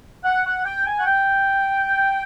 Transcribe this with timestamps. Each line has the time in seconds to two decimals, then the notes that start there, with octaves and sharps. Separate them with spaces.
0.25 F#5
0.45 F#5
0.65 G5
0.86 G#5
0.99 F#5
1.06 G5